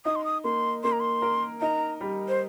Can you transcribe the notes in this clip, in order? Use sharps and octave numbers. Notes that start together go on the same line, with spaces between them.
D#4 D#6
C6
D#6
A#3 C6
A#3 C6
A#5
C6
A#4
D#4 A#5
G3
C5